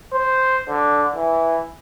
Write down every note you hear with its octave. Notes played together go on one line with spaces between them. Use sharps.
C5
D3
E3